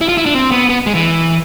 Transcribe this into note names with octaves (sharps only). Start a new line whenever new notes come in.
E4
F4
E4
D4
C4
B3
B3
G#3
E3